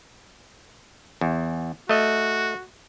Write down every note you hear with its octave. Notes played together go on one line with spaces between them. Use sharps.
E2
A3 F#4 D#5